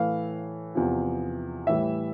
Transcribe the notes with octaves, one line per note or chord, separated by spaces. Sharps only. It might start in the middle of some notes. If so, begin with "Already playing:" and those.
Already playing: A2 E3 A3 F5
E2 C3 F3
A2 E3 G3 E5